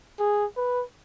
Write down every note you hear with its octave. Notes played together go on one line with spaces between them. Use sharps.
G#4
B4